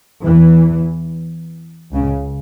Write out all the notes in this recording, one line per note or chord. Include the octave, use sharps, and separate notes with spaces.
E2 E3
C#2 C#3